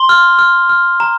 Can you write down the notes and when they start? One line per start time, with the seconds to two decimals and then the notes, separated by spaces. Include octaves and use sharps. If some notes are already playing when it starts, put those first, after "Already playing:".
Already playing: C6 G7
0.09 F6
0.39 F6
0.69 F6
1.00 A#5